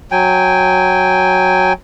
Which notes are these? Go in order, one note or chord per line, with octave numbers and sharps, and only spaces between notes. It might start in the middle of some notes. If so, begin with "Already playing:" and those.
F#3 G5 G#5